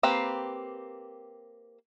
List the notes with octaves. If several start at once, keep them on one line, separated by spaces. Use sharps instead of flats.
A#3 C4 G4 B4